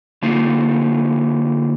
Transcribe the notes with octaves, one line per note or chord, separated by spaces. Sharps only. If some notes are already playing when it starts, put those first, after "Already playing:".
D3 A#3 D#4 F4